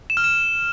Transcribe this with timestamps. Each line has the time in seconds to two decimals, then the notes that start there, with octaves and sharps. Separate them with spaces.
0.10 E7
0.17 F6
0.24 E7